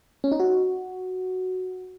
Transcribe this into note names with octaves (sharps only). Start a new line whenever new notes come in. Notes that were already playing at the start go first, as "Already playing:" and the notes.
C#4
D#4
F#4